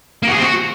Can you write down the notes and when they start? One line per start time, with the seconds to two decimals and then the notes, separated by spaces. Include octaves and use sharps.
0.23 A#3
0.28 F#4
0.33 G#4
0.38 C4
0.43 F#4